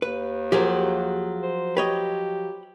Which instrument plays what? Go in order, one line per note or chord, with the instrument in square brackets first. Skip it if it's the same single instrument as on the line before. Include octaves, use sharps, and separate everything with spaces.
[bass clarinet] D#2 [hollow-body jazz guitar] B4
[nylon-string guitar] F3 F#3 [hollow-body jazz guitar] G4 G#4 A#4
[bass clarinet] C5
[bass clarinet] G4 [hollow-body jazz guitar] B4 C#5 D#5